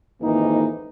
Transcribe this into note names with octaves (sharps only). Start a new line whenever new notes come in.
F2 G#2 D#3 E3 A#3 D#4